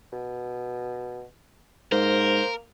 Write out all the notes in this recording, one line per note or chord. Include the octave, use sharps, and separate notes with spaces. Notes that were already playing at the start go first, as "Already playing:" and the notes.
B2
G#2 A#3 A#4 C5